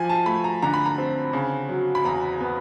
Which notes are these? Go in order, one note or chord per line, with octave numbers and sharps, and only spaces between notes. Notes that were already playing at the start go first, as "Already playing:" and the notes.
Already playing: F3 G#5
A5
A3 B5
A#5
D3 A#5
B5
A#5
C4
C#3
F#3
B5
E2 A#5
B3